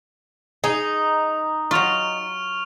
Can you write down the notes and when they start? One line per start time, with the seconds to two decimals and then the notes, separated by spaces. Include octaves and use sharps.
0.64 D#4 G#4
1.71 F#3 F4 C#6 F6 F7